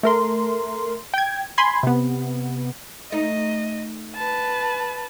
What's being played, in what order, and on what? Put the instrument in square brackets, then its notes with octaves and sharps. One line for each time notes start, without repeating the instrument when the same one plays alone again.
[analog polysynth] A3 A#4 C6
G5 G#6
G#5 B5 C6 G#6
C3 B3
[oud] A3 D#4 [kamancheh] D#5
[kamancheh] B4 A5